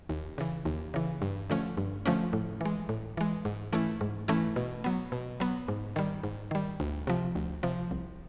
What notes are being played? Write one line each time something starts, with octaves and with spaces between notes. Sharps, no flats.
D#2
C#3 E3
D#2
C#3 E3
G2
D3 F3 A3 C#4
G2
D3 F3 A3 C#4
A2
E3 G#3
A2
E3 G#3
G#2
E3 A3 C#4 E4
G#2
E3 A3 C#4 E4
B2
F#3 B3
B2
F#3 B3
G#2
D#3 G3
G#2
D#3 G3
D2
C3 F3
D2
C3 F3
C2